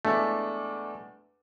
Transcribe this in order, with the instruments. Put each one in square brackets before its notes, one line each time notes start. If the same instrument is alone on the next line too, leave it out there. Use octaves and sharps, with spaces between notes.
[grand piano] E2 G#3 D4 [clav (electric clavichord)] A3